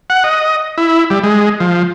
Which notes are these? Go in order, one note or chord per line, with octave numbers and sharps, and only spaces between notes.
F#5
D#5
E4
G3
G#3
F3